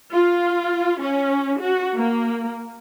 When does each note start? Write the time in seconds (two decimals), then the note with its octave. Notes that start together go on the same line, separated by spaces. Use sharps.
0.12 F4
1.01 C#4
1.60 F#4
1.95 A#3